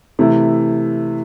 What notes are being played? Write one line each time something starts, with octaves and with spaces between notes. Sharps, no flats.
C3 E3 A3 E4